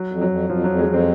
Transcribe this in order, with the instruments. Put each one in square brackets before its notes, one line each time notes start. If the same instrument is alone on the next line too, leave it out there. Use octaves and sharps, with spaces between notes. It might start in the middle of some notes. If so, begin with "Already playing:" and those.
Already playing: [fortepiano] F#3
[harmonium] F2
[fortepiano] F#3
[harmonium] F2
[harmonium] F2 [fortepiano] F3
[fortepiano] F#3
[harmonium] F2
[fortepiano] G#3
[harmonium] F2 [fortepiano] C4